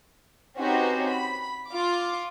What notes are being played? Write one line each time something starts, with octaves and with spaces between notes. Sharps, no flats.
C4 C#4 D#4 F#4 G4 B4
B5
F4 D6